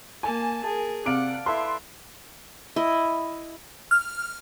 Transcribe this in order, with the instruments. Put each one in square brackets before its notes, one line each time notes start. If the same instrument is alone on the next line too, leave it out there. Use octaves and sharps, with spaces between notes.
[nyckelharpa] A#3 A5 [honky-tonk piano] G#5
[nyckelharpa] G#4 A#4 [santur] A5
[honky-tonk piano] C3 D7 [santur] D5 F5 [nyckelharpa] F#5
[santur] E4 A4 B4 [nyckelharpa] E5 [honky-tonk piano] C6
[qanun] E4 D#5
[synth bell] F6